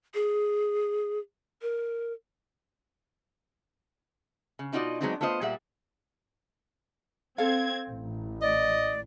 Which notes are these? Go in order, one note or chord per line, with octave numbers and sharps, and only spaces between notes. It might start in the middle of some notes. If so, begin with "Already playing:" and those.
G#4
A#4
C#3
B2 D#4 F4 F#4 D5 D#5
F#3 G#3 B3 C4 D4 D#4
A3 B3 F4 C5 D#5
A#2 G3 G#4 E5 F#5
C4 A4 F5 G#6
A1
D5 D#5